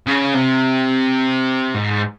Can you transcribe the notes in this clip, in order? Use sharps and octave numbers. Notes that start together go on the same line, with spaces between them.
C#3
C3
G#2